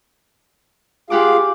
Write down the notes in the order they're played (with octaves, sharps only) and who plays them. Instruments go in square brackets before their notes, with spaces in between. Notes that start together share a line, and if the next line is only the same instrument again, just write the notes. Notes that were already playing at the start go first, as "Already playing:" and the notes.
[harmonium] F4 G#4 F5 [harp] G4 F#5 D6